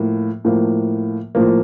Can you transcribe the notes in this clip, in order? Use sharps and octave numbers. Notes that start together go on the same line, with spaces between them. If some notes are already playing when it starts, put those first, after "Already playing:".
Already playing: A2 F3 A#3
A2 F3 A#3
A2 F3 A#3